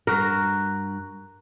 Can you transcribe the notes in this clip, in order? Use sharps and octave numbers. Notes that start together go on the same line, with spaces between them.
G2 F#4 A#4